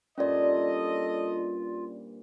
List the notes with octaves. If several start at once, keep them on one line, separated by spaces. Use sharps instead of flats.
G2 A#2 C#4 F4 A4 C5 D5 D#5